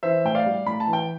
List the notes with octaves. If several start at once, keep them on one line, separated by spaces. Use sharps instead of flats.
E3 C5 E5
A2 G5
D5 F5
G3
A2 B5
A5
E3
G5